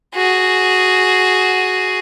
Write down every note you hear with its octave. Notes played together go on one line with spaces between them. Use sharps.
F#4 G#4